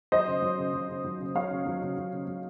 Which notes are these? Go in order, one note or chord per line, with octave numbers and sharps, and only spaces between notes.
F#3 C5 D#5
C#3
F#3
C#3
F#3
C#3
F#3
C#3
F#3 C#5 F5
C#3
F#3
C#3
F#3
C#3
F#3